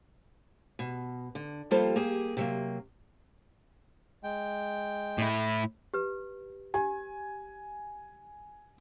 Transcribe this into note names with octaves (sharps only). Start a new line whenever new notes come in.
B2
D3
F2 G3 A#3 F4 A4 C5
A#3 G4 G#4
C3 F#3 A#3
G#3 G5
A2 E4
G4 B4
G4 G#5